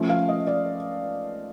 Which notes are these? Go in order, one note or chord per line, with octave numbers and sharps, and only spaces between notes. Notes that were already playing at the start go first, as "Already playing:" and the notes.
Already playing: F3 A3 C#4
F5
D#5
D5